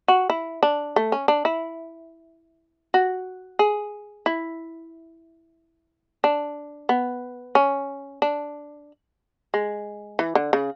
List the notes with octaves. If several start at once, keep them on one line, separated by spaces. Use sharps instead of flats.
F#4
E4
D4
A3
C#4
D4
E4
F#4
G#4
E4
D4
B3
C#4
D4
G#3
E3
D3
C#3